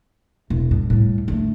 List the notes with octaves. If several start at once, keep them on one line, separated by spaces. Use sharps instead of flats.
E1
G2
A2 G3
D3 A3